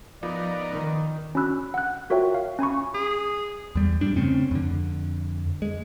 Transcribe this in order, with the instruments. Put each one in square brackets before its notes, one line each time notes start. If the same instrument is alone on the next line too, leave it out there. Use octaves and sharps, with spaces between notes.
[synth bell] F3 [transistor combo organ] B3 D#4 A#4 [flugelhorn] D5
[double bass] D#3
[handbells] C#4 D4 F#4 B5 E6 F#6
F#5 F#6
F4 F#4 A#4 C#5 E5 G5
F5
C#4 G#5 B5 C#6
[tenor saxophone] G#4
[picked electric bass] E2 G3
F2 G#2 G3 D4
C#3 A3 C4 C#4
F2 D3
G#3